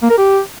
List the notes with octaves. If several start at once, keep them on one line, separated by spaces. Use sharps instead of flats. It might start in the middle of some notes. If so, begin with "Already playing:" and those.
A#3
A#4
G4